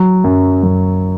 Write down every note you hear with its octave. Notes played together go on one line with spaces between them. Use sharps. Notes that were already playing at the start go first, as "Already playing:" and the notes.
Already playing: F#3
F#2
F#2